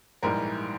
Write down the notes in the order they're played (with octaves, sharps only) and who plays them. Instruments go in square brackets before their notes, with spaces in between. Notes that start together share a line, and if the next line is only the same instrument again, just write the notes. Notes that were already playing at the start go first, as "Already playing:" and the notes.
[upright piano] A#1 G#2 E3 G3 A#4